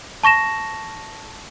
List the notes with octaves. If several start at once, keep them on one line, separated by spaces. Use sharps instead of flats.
A5 C#6 A#6 E7